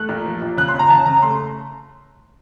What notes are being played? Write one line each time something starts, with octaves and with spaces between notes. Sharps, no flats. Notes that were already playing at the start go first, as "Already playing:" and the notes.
Already playing: A3 F#6
A#2
F3
A#2
C#3 F#6
C6
C#3
A#5
C#3 A5
C#3 A#5
A3 C6